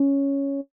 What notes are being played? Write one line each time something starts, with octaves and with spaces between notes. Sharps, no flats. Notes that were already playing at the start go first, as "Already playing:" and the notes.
Already playing: C#4